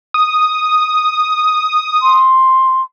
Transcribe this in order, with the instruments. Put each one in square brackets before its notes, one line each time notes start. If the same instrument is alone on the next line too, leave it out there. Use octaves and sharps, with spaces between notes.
[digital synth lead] D#6
[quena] C6